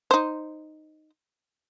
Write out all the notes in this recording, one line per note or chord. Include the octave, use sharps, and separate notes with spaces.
D#4 C5